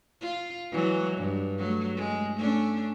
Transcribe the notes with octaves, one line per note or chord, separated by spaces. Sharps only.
F4
E3 F#3 G#3
G2
F#3 A3
G#3
A3 C#4 D4